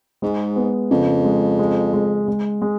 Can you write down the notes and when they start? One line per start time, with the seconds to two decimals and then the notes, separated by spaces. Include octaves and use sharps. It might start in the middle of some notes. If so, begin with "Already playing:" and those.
0.22 G#2 G#3
0.56 B3
0.91 F2 C#3
1.25 G#3
1.59 G#3
1.94 G#3
2.28 G#3
2.62 G#3